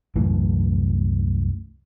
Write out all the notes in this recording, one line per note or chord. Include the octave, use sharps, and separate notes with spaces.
C2 F#2 A2 E3